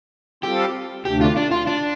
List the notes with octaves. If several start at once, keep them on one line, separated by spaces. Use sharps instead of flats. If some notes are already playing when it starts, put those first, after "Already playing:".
G3 C4 F4 G4 A4
D2 C3 A3 D4 G4
F4
D4
F4
D4